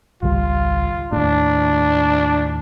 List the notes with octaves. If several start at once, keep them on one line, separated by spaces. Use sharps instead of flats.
G#1 C#2 G3 F4
D#2 A2 D4